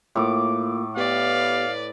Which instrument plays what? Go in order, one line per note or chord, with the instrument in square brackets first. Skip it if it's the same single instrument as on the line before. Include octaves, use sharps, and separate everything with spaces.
[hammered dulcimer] A2 D6 [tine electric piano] A#3 F4
[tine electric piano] B3 G4 [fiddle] B4 D5 [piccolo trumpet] F5